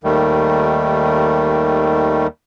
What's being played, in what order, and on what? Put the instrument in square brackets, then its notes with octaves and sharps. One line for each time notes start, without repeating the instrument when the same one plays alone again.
[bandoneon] D#2 D#3 G3 A3